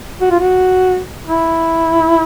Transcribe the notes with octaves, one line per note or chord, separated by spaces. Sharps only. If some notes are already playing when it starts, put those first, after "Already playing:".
F#4
F4
F#4
E4